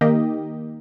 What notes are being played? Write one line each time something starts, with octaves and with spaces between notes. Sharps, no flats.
D#3 A#3 D#4 G4 D#5